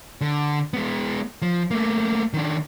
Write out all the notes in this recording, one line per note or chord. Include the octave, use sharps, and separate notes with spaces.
D3
G#3 B3
F3
A3 A#3
D#3 D4